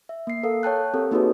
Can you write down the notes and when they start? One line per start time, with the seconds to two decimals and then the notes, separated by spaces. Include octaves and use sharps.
0.09 E5
0.27 A#3 C7
0.43 A4 A#4 F5
0.63 C#5 G5 A5 F#6
0.94 C4 G4 A4 A#4
1.11 A#3 D#4 F#4 G#4 B4 C#5